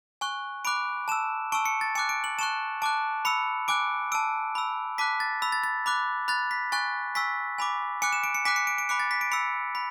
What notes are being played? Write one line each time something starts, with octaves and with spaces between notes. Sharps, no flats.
G#5 C#6 F#6
B5 D6 F#6 D7
A5 E6 E7
A5 C#6 E6 D7
C#7
A6
G#5 D6 F#6 C#7
D7
F#7
A5 C#6 F#6 E7
A5 D6 F#6 D7
B5 E6 C#7
G#5 D6 F#6 D7
A5 E6 D7
B5 E6
A5 D6 F#6 B6
A6
B5 E6
A6
A6
B5 D6 F#6
B5 F#6 A6
B6
G#5 C#6 F#6 A6
G#5 C#6 E6 B6
G#5 B5 D6
G#5 D6 F#6 C#7
E7
D7
C#7
G#5 D6 F#6 B6
C#7
D7
D7
B5 D6 F#6 C#7
A6
B6
D7
B5 E6 C#7
B5